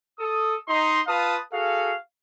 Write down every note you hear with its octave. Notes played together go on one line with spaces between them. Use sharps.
A4 D#6
D#4 C6
F4 B4 F5 A5 D#6
F#4 G#4 A4 F5